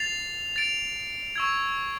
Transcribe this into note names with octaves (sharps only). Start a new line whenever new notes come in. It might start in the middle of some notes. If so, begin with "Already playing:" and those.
Already playing: A6 C7 F7
A6 D7 F7
C#6 E6 G#6